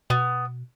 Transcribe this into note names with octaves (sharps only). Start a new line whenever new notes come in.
B2 B3